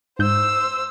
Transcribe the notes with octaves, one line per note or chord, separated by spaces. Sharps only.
G#2 C5 E6 G6